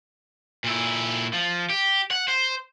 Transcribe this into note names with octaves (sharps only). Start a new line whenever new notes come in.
A#2 E4
F3
G4
F#5
C5